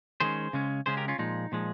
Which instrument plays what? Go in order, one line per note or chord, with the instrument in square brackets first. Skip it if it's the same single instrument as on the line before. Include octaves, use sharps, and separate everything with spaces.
[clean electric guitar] D#3 G#3 C#4 G#4 C5
C#3 G#3 C#4
C#3 G#3 C#4 G#4 C5
G4 A#4
C#4 F4
A#2 F3 G#3 D#4
A#2 F3 G#3